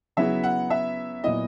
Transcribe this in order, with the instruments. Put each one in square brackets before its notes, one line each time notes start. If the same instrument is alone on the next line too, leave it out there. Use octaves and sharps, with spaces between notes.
[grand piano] C#3 F#3 B3 E4 G#4 [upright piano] E5
[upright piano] F#5
E5
[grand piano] A#2 F#3 B3 E4 [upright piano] D#5